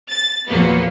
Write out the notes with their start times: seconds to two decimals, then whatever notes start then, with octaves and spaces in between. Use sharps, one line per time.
0.10 A6
0.48 E2 A#2 F3 F#3 A#3 B3